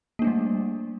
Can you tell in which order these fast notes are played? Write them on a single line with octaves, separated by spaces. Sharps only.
A#3 D4 A3 G3